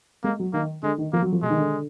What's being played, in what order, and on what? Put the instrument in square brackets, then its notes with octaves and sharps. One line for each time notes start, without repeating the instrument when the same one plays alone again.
[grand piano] G#3 [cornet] A#3
[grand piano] F#3
[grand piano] D#3 [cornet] A#3
[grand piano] D3 [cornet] G#3
[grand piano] D#3
[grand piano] F3 [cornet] A#3
[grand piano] F#3
F3
[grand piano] B2 [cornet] G#3
[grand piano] D#3
D3